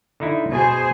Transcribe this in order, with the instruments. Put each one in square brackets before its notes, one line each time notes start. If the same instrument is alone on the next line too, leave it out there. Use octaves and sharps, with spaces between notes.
[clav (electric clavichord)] D3 D#4 E4
[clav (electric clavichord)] B2 G#5 [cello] G#4 C5